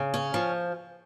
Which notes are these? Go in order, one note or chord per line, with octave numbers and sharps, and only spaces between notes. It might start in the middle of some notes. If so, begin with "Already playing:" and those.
Already playing: C#3
C#4
F3